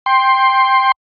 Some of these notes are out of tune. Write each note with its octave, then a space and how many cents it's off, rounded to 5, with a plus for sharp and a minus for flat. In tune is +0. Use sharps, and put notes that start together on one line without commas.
G5 +5 C6 +10